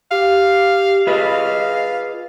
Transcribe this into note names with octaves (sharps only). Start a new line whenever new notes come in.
G4 F5
F4 G#4 B4 D#5 F5